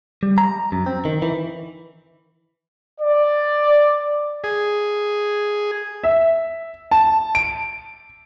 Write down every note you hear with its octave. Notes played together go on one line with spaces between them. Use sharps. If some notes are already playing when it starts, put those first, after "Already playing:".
G3
A#5
F#2
C4
D#3
E3
D5
G#4
E5
A5
D7